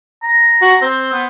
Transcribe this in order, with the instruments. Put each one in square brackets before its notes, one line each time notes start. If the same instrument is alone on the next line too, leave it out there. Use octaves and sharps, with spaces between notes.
[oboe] A#5
[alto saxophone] F#4
[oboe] C4 [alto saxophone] C5
[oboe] B3